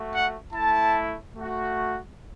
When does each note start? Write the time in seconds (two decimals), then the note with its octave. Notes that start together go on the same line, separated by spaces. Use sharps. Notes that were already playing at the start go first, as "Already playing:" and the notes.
Already playing: A3 F#4
0.13 F#5
0.53 A3 E4 A5
1.34 A3 F#4